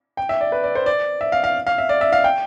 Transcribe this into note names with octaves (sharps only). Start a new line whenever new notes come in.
G5
E5
D5
B4
D5
C5
D5
E5
F5
F5
F5
E5
D5
E5
F5
G5